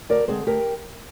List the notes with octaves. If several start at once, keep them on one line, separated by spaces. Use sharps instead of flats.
D2 A#4 D5
D3 G#3 C4 G#4 C5
D2 G4 A#4